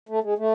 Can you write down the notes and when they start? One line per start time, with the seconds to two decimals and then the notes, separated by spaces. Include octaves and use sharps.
0.09 A3
0.23 G#3
0.39 A3